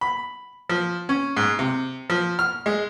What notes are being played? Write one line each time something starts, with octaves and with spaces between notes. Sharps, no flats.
B5
F3
C#4
G#2
C3
F3
F6
G#3